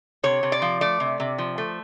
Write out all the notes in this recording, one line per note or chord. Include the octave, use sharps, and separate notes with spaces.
C3 C#5
C3
D5
F3
A3 D5
C3
C3
F3
A3